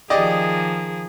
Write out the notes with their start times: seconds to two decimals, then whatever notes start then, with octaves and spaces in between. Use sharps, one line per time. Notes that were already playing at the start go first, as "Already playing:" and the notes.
0.10 D#3 F3 G4 G#4 D5 D#5